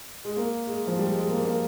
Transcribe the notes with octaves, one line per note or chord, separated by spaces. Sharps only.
G#3
A#3
G#3
F3
G3
G#3
A#3
A#3